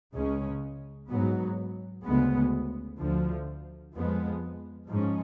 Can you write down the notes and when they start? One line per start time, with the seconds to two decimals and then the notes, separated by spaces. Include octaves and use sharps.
0.14 C#2 C#3 G#3 C#4
1.09 G#2 F#3 B3
2.04 D2 C#3 G#3 B3
2.99 D2 D3 F3
3.93 F2 F3 G#3 B3
4.88 G#2 F3 G#3 C#4